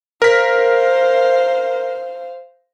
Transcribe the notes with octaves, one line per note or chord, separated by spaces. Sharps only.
A#4 C5 F5 B6